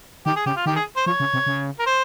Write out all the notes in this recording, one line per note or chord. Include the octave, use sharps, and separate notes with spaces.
D#3 G4
G#4
C#3 G4
F4
D#3 G4
G#4
C5
F3 C#5
C#3
C3
C#3
A#4
C5